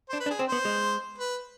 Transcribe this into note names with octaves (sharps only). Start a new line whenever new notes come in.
D4 C5
B4
D4
G#4
C4
B3 C5
G#3
B4